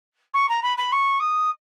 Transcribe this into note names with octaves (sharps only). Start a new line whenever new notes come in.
C#6
A#5
B5
B5
C#6
D#6